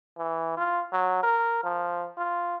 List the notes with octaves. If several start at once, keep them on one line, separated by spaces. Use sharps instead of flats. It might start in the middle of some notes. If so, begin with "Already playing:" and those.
E3
F4
F#3
A#4
F3
F4